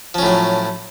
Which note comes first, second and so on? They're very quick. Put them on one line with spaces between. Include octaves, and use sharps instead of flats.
F3 C#4 A2 F#3